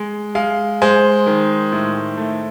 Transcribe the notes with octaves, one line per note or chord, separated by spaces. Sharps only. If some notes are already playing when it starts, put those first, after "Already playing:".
Already playing: G#3
G#3 F5
G#3 C5
D#3
A2
A3